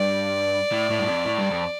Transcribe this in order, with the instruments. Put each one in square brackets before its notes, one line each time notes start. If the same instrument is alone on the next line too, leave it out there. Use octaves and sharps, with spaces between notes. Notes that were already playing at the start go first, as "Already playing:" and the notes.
Already playing: [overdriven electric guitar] G2 [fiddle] D5
[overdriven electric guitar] A2
A2
G2
F2
A2
G2
F2